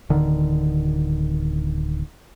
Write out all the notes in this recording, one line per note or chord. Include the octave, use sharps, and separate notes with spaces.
D1 D3 D#3